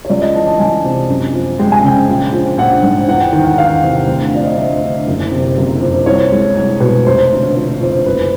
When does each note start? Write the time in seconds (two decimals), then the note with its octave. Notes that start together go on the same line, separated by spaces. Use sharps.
0.05 C#5
0.10 C#2 D5
0.22 D#5
0.35 E3 A5
0.46 A5
0.59 C#2 G#5
0.84 C3
1.09 F#2
1.34 F3
1.59 G#3 G5
1.72 G#5
1.84 C#3 G5
2.09 A#1
2.33 F3
2.58 A#1 F#5
2.83 G#2
3.08 E2 F#5
3.21 G5
3.33 D#3 G5
3.45 F#5
3.58 E2 F5
3.83 C3
4.08 D2
4.33 F3 D5
4.45 D#5
4.57 D2 E5
4.82 D3
5.07 F#1
5.32 C3
5.57 F#1
5.81 F2
6.06 C2 C#5
6.32 G#3
6.56 C2
6.80 B2
7.06 F1 C5
7.31 D3
7.56 F3
7.81 F2
8.06 F#1 B4